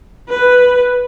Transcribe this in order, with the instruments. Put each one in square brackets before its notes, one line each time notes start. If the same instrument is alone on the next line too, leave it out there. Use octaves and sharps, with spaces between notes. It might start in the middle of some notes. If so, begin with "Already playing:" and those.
[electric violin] B4